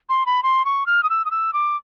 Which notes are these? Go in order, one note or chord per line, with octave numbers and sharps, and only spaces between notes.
C6
B5
C6
C#6
F6
D#6
E6
D#6
E6
D6